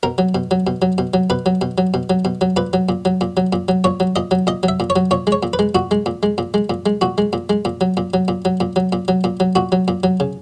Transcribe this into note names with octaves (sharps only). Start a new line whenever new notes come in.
B2 A#4
F#3
B2
F#3
B2
F#3
B2
F#3
B2 B4
F#3
B2
F#3
B2
F#3
B2
F#3
A#2 B4
F#3
A#2
F#3
A#2
F#3
A#2
F#3
A#2 C#5
F#3
A#2 D#5
F#3
A#2 D#5
F#3
E5
A#2
C#5
F#3
A#2 C#5
G#3
C#5
A#2
B4
G#3
A#2 F#4
G#3
A#2
G#3
A#2
G#3
A#2
G#3
A#2 F#4
G#3
A#2
G#3
A#2
F#3
A#2
F#3
A#2
F#3
A#2
F#3
A#2
F#3
A#2
F#3
A#2 F#4
F#3
A#2
F#3
C#3